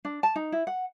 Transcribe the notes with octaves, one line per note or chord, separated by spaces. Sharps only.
D4
A5
D#4
E4
F#5